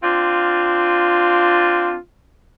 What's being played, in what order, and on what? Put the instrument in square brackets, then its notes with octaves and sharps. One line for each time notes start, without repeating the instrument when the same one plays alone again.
[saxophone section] C4 D4 F4